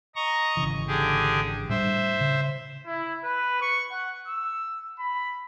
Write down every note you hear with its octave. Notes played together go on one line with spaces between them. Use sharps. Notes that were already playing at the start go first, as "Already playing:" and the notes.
D#5 A#5 C#6
G#1 C#3 E3
D3 G4 G#4
A2 G3 D4 C5 E5
C#3
E4
B4
C#6
F#5
E6
B5